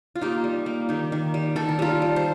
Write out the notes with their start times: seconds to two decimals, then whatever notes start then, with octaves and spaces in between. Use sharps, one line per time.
0.16 F4
0.21 A#3 D#4 G4
0.44 G3
0.66 A#3
0.89 D#3 D#4 G4
1.12 D#3
1.34 G3
1.56 D#3 A4
1.69 A#4
1.79 G3 F4 A4
2.02 G3
2.16 C5